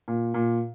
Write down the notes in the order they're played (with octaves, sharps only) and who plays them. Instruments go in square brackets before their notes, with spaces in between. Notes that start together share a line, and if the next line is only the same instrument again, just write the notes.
[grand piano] A#2
A#2